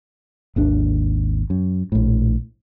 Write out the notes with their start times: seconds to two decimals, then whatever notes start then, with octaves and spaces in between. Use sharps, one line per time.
0.56 G#1 D#2 D4
1.50 F#2
1.92 A#1 A2